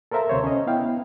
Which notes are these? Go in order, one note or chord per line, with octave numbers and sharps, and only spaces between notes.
A4 A#4 C5 E5 F5 A#5
D2 C3 C5 C#5
C#4 D#5
B3 E4 F5 G5